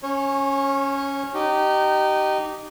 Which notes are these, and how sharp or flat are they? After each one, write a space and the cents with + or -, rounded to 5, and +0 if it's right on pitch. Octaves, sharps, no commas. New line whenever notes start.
C#4 +0 C#5 -25
D#4 -20 G4 -25